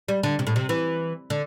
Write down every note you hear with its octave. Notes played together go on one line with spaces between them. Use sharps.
G3
D3
C3
A2
C3
E3
D3